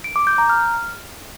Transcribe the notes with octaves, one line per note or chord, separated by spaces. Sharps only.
D7
D6
G6
A#5
F6